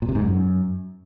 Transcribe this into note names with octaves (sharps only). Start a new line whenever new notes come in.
A#2
C3
G#2
F#2